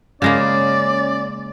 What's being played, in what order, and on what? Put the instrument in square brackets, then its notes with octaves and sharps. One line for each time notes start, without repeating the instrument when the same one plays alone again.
[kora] C#3 G#3 A#3 [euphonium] C#4 [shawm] D5